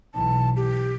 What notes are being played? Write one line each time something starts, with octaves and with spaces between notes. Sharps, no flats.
B1 E3 A5
G4